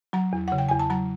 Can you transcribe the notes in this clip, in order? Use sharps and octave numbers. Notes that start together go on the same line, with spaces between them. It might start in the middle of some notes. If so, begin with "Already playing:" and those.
F#3 A#5
E2
C#3 F#5
G5
E2 G#5
A5
F#3 A#5